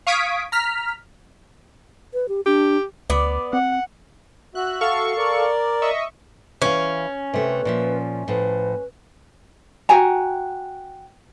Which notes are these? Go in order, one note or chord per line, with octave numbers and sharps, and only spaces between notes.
F5 C#6 D#6 G#6 B6 D7
A#5 F6 B6
B4
G4
D4 G4
D2 B3 D5
C4 F#5
F#4 E5 F#6
A4 F5 C#6
A#4 D5
D#5 E5 C#6
E3 C#4 F5
C3 A3 B4
A#2 F3 E5
A2 F3 B4
F#4 G5 G#5 A#5